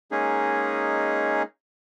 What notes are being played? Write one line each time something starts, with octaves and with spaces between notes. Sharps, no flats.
G#3 A#3 C#4 D#4 G#4